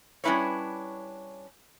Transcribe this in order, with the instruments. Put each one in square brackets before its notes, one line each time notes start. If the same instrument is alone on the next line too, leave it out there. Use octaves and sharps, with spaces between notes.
[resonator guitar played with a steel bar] G3 C#4 D4 E4 B4 C#5